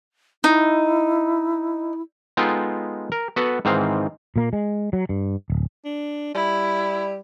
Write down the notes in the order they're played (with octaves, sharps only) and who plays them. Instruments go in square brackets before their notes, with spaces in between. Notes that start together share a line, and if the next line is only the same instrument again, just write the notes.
[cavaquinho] D#4 [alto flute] E4
[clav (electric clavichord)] G#3 B3 D#4 F4 A4 G5
A#4
B3 F#4 A4 B4 F#5
G#2 D#3 E3 C4 F5
[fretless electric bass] A#2 A#3
G#3
F#3
G2
D1
[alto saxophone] D4
[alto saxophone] G3 [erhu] E4